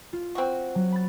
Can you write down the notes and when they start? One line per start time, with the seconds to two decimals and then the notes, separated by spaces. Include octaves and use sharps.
0.13 F4
0.35 C4 F#4
0.75 F#3
0.92 B5 A6